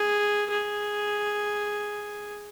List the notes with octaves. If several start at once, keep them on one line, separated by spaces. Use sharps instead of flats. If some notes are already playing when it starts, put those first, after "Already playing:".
Already playing: G#4
G#4